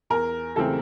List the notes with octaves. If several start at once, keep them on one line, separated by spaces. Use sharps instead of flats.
E2 A#4
C#3 E3 A3 C4 A4